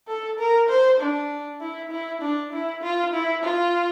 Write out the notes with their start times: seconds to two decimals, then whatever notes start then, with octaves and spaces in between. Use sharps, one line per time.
0.08 A4
0.39 A#4
0.69 C5
1.00 D4
1.61 E4
1.91 E4
2.21 D4
2.53 E4
2.82 F4
3.14 E4
3.44 F4